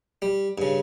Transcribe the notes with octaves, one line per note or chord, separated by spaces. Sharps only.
G3
G2 C#3